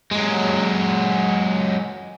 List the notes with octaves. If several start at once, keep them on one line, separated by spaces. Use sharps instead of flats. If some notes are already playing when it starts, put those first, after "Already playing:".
F#3 G#3